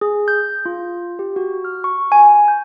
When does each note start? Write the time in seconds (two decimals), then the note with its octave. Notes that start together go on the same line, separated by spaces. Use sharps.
0.01 G#4
0.28 G6
0.66 F4
1.19 G4
1.36 F#4
1.65 F6
1.84 C#6
2.12 G#5
2.48 G6